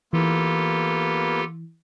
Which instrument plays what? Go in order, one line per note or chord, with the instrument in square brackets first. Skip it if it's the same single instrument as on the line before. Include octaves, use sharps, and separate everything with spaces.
[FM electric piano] E3 [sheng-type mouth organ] A#3 B3 [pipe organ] F4 G4 A4